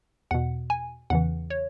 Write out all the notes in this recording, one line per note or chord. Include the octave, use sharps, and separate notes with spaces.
E2 B2 F#5
G#5
E2 C#3 E3 F#5
C#5